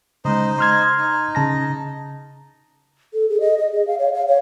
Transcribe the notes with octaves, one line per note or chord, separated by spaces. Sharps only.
C#3 G#3 D#4 C5 D#5
C6 F6 G#6
D#4
C#3 A5 A#6
A4
G#4
D#5
D#5
G#4
F5
C#5
F5
C#5